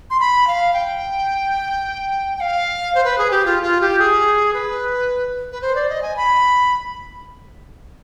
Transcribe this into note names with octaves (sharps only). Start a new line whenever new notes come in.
C6
B5
F5
G5
G5
F5
C5
B4
G#4
G4
F4
F4
G4
G#4
B4
B4
C5
D5
D#5
G#5
B5